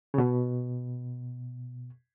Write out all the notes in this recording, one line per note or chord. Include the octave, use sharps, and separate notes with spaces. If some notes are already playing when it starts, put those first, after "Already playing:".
C#3
B2